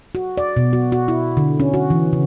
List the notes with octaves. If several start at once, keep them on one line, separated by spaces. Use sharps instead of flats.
F#4
D5
B2
F#4
F#4
E4
D3
C#4
F#4
E3
C#3